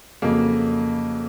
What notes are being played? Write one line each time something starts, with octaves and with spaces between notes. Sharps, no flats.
F2 C#3 F#3 A#3